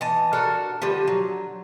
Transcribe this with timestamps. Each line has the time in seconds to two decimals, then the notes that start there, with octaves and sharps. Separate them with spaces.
0.01 E3 D#5 A5
0.33 D4 F#4 A4 A#4
0.82 D3 F3 G3
1.07 F#3